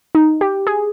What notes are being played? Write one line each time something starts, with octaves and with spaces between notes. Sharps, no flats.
D#4
G4
G#4